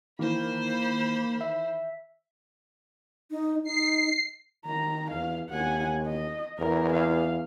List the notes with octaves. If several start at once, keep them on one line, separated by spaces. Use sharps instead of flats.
D#3 E3 A#3 C5 B5
E5
D#4
D#4 C7
D#3 A#5
E2 F5
D#2 F#5 G#5
D#5
E2 A#4
F5